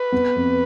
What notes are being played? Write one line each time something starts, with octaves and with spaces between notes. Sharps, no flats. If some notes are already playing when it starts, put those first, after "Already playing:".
Already playing: B4
B3
F2